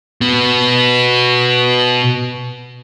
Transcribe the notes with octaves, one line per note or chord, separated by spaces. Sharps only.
B2 B3